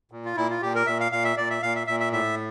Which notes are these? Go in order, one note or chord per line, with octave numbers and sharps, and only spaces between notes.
A#2
F4
A#2 E4
F4
A#2 G4
A#4
A#2 E5
F5
A#2 F5
E5
A#2 D5
E5
A#2 F5
E5
A#2 E5
E5
A2 E5